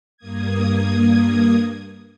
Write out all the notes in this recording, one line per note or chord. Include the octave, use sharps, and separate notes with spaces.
G2 A#3 D#6 G#6